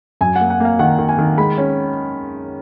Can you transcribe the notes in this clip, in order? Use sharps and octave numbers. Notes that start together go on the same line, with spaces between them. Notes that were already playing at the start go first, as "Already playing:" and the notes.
F#2 G#5
A#3 F#5
F#5
A#3 F5
D#3 F#5
D#3
G#5
D#3
G#3 B5
C#4